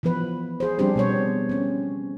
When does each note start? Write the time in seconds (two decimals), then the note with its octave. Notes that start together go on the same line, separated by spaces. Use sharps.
0.03 E3 F3 B3 B4
0.60 G#4 C5
0.79 F3 G3 C4 D4 G4 C5
0.96 B2 B3 C#5
1.49 C4 C#4